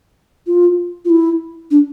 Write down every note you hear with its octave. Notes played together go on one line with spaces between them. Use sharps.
F4
F4
E4
D4